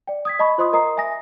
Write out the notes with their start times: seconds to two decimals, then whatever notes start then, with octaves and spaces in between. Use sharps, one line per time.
0.07 D5 G5
0.25 D#6 G#6 B6
0.39 D#5 A5 B5 C#6
0.58 F4 C5 D#5 C6 D#6
0.73 A#4 D#5 A#5 D#6 C7
0.97 E5 G#5 D#6 A#6